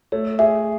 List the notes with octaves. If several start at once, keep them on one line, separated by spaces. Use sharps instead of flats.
A3 C#5
G#4 E5